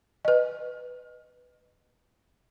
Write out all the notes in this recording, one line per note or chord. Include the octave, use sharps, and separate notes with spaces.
B4 D#5